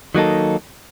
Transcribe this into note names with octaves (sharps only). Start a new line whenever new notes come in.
D#3 F#3 A#3 D#4 A4